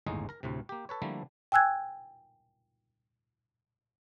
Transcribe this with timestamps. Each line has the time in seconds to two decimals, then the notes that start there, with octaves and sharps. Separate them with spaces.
0.06 G1 D#2 A2 G#3 D#4 D#5
0.29 A#4 A#5
0.43 D2 A2 C3
0.69 A#3 G4
0.89 A4 B4 C#5
1.02 D3 F3 G3 A3 A#3 E4
1.52 G5 G#5 E6 F#6 G#6